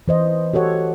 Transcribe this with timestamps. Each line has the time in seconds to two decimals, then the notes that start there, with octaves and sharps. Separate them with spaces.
0.08 E3 C5 D#5
0.53 F#4 G4 A4 C#5 F#5